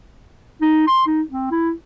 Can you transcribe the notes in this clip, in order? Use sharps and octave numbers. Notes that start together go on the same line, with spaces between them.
D#4
C6
D#4
C4
E4